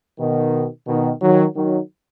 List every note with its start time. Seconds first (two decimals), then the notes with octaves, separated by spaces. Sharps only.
0.20 B2 D#3
0.87 B2 D#3
1.21 D#3 F#3
1.55 D#3 F#3